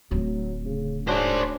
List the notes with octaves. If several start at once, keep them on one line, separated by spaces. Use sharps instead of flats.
D1 D2 F#3
C#3
G#2 C#4 D4 F#4 C5 D5